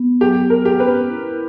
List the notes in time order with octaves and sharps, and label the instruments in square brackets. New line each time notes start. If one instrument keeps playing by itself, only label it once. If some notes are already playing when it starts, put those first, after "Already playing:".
Already playing: [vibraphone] B3
[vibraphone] F#3 [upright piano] G4
[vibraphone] B3 [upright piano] A#4
[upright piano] G4
[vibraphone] C#4 [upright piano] B4
[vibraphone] E4